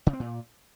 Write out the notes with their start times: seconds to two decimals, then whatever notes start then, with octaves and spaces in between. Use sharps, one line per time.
0.07 C#3
0.13 C4
0.20 A#2